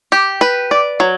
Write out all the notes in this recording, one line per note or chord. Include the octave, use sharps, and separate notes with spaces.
G4
B4
D5
F#3